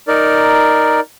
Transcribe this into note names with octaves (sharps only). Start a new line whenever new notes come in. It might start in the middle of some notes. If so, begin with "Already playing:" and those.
D#4 A#4 D5